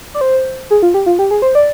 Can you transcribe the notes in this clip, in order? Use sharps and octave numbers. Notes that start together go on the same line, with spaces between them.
D5
C5
G#4
F4
G4
F4
G4
G#4
C5
D5